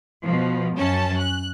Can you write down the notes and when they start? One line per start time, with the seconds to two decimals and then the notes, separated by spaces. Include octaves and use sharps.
0.24 B2 F3
0.76 F#2 C#4 A5
1.18 F#6